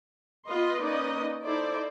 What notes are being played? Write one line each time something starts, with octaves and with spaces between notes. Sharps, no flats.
B3 F4 B4 D#5 C6
A#3 C#4 D#4 B4 D5 D#5
D#4 E4 A4 C5 D5